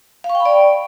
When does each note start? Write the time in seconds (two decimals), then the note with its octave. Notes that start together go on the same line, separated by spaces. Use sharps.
0.24 F5
0.30 C#6
0.35 G5
0.40 B5
0.45 D5